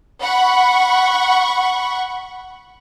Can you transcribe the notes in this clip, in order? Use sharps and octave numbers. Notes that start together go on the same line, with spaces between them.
F#5 B5 C#6